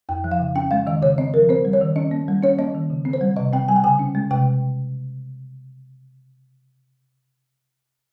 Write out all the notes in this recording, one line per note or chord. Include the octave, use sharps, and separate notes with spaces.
F2 G5
F3
F5
C#3
C#4 G5
G#3 F5
D#3 D#5
C#3 C#5
C4 D#5
F3 A#4
C4 C5
G3
C#5
D#3
C#4 D#5
A#3
G3
C#4 C#5
A#3 D#5
D#3
C#3
C4
C5
G3
C3 D#5
C4 G5
G3 G#5
G5
C#3 G#5
C#4
G#3
C3 G5